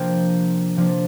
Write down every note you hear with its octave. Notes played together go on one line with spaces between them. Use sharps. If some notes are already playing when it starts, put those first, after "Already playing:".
Already playing: C3 F3 A#3 D4 G5
C3 F3 A#3 D4